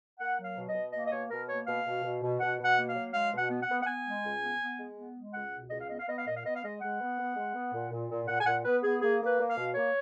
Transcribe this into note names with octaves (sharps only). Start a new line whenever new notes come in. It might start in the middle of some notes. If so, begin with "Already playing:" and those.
A#3 F#5
F#3
F5
B2
D#5
B2
A#3 D#5
D#5
B2 C#5
B2 A#4
A#3 C#5
B2 F5
B2
B2
B2
B2 F#5
B2
F#5
A#3
F5
F#3
G#3 F5
B2
F#5
B3
F#5
B3
F#5
B3 G#5
G#3
C#2
B3
B3
G#3
B3
G#3
C#2 F#5
B2
C#2 D#5
F5
B3 D#5
F5
B3 D#5
F5
A#2 D#5
F5
B3 D#5
F5
G#3 D#5
G#3 F#5
B3
B3
G#3
B3
A#2
A#2
A#2
A#2 F#5
G#5
A#2 F#5
B3 B4
B3 G#4
A#3 G#4
A#3
B4
A#3
F5
B2
A#3 C#5